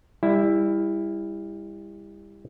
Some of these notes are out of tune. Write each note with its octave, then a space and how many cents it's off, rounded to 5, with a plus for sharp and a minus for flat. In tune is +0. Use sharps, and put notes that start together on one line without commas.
G3 +30 E4 +0